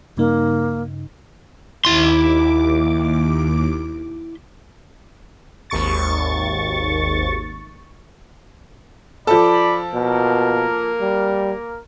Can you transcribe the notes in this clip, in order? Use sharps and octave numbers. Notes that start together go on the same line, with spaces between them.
G2 C#3 A#3 D#4
D#2 E4 C6 D6
G#1 D#2 C#6 A6
F3 A4 D5 B5
B2 A#3 A#4
G3